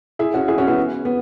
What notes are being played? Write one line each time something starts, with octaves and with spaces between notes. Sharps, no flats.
E4 G#4
C#4 F#4
E4 G#4
C#4 F#4
B3 E4
B3